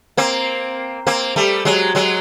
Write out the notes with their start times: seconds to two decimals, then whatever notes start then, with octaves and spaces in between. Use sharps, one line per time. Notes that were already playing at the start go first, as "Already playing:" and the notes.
0.17 A#3 C4
1.07 A#3 C4
1.36 G3 A3
1.65 F#3 G#3
1.95 F#3 G#3